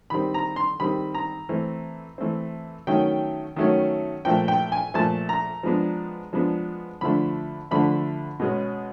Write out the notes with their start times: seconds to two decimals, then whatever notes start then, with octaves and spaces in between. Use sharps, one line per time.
0.10 D#3 G3 C4 B5
0.34 A#5
0.56 C6
0.80 D#3 G3 C4 B5
1.15 A#5
1.49 E3 A3 C4
2.18 E3 A3 C4
2.87 D#3 F#3 A3 C#4 G5
3.56 D#3 F#3 A3 C#4
4.25 A#2 F3 A3 G5
4.48 G5
4.72 G#5
4.94 A#2 F3 A3 A5
5.29 A#5
5.63 F3 G#3 B3 D4
6.33 F3 G#3 B3 D4
7.01 D3 F3 A3 D4 B5
7.71 D3 F3 A3 D4 B5
8.40 B2 G#3 C#4